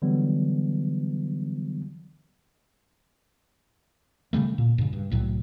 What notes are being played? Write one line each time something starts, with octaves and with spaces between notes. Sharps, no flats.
D3 E3 F#3 G3 B3
C#3 E3 G3 A3
A#2
G2 C#3
G2
C2 A2 F#3